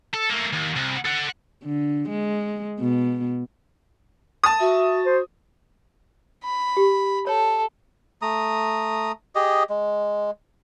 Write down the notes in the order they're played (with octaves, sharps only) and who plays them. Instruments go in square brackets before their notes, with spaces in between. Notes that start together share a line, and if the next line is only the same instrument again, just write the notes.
[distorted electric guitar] A4
A3 A#3
D#2
C2
A4 F#5
[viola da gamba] D3
G#3
B2
[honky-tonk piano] A5 D#6
[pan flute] F#4 [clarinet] E5
[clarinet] C5
[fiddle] B5
[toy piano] G4
[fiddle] A4 [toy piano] C#5
[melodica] A3 A#5 D#6
G4 G#4 D#5
G#3